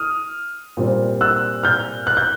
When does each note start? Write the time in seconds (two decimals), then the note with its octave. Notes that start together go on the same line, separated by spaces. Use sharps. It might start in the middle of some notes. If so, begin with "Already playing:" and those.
Already playing: D#6 F6
0.77 A#2 G3 C4
1.21 E6 F#6
1.63 F6 G6
2.07 F#6
2.17 G6